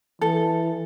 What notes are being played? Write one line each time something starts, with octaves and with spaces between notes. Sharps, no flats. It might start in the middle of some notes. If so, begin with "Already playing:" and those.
E3 A4